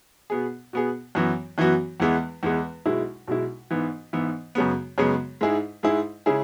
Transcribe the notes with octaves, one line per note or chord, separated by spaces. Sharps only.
B2 B3 G#4
B2 B3 G#4
F#2 E3 B3 F#4
F#2 E3 B3 F#4
E2 E3 G#3 B3
E2 E3 G#3 B3
B1 B2 G#3 E4
B1 B2 G#3 E4
G#2 E3 B3
G#2 E3 B3
F#2 C#3 G#3 B3
F#2 C#3 G#3 B3
G#2 G#3 E4 G#4
G#2 G#3 E4 G#4
C#3 G#3 E4 G#4